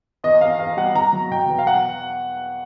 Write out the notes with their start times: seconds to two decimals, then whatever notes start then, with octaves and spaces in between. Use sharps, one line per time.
0.24 E2 D#5
0.41 E2 F5
0.59 E2 F5
0.77 G3 F#5
0.95 E2 A#5
1.13 F#3
1.31 B2 G5
1.49 E2
1.59 F5
1.67 F#5